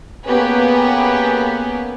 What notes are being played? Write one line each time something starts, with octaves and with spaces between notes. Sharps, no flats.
A#3 B3 C#4 G4 G#4 B4